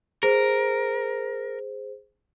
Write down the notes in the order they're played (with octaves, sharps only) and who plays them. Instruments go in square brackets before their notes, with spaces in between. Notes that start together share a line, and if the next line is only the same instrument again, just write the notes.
[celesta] G#4 C5 [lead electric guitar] A#4